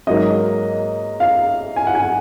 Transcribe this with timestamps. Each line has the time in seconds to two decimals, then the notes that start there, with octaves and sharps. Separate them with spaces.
0.07 G#2 F#3 A#3 D#4 D#5
1.20 F5
1.76 G#5
1.87 F#5
1.95 G#5